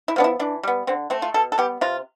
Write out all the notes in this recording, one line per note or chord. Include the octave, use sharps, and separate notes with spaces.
E4
F3 B3 D4
E4
E3 D4
G3 B3
D3 C4
A3 C4
F4
B2 A4
A4
G3 B3 G4
C3 F4